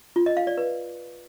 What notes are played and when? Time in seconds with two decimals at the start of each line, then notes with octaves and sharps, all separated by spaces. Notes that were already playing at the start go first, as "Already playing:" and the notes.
0.16 F4
0.26 D#5
0.37 F5
0.47 D5
0.57 B4